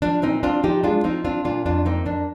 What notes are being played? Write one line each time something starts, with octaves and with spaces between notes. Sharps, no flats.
F3 D4
A#2 C4 D#4
C4 D4 F4
F3 D#4 G4
G#3 D4 F4
F3 C4 D#4
C4 D4 F4
A#2 D4 F4
F2 D4 F4
A#3 C4 D#4
F2 D4